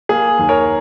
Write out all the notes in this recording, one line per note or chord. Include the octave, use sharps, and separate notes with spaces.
A#3 G#4
D#2
A#4 C#5